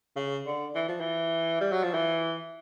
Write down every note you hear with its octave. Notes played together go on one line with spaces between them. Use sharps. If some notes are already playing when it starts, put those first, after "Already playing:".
C#3
D3
E3
F3
E3
G3
F#3
F3
E3